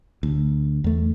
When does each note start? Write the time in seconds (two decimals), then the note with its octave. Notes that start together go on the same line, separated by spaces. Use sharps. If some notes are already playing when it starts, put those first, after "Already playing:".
0.23 D2
0.84 E2 A3